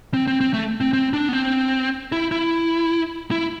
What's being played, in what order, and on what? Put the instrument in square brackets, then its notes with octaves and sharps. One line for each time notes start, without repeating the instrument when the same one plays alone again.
[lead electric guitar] C4
C4
C4
A3
C4
C4
D4
B3
C4
E4
E4
E4